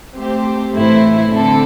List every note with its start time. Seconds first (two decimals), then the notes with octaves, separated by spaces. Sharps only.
0.16 A3 C4 G4 C5
0.74 A2 E3 A3 E4 C5
1.31 D3 C4 A4